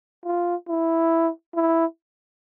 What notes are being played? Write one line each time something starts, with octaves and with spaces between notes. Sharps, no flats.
F4
E4
E4